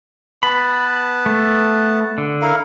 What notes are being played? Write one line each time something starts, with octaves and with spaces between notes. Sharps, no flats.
B3 B4 A5 B5
A3
D3
E4 A#4 F5